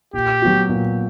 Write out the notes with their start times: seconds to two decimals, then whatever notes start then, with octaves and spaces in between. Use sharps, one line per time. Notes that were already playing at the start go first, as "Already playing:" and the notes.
0.14 A#2 G4
0.42 F#3 B3 F#4
0.69 A#2